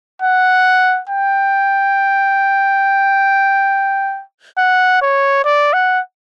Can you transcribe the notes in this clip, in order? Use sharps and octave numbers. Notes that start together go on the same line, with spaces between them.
F#5
G5
F#5
C#5
D5
F#5